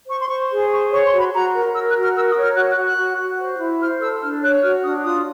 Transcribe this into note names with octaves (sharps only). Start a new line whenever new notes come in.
C5 C#6
C6
C5 C#6
G#4
C5 C#6
C#5 C#6
C6
F#4
B5
F#4 A#5
A#4
A#4 E6
F#6
F#4
F6
A#4 E6
D#6
C#5
F6
F#4 F#6
F#6
F#4
F#6
F#4
F#4
C5
E4
C5 F6
A4 E6
D4 F6
C#5 F#6
F#4 F6
D4 D#6
F4 D#6